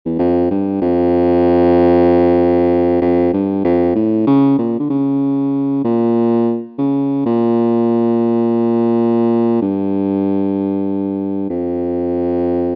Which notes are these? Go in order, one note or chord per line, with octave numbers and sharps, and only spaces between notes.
E2
F2
G2
F2
F2
G2
F2
A2
C#3
A#2
D3
C#3
A#2
C#3
A#2
G2
F2